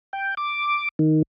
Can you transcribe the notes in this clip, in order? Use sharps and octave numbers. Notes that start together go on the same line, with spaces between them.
G5
D6
D#3